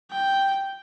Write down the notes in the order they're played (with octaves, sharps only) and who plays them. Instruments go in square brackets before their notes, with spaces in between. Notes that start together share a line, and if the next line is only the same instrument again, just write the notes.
[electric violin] G5